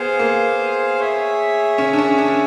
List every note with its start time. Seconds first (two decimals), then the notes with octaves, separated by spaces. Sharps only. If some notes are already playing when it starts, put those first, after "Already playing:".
Already playing: B3 G#4 C5 F5
0.19 A#3
0.99 G#4 C#5 E5
1.78 C#4
1.93 D4
1.99 C#4
2.18 D4